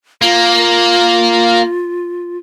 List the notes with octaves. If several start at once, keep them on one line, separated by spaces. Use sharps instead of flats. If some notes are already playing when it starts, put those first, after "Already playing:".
A#3 F4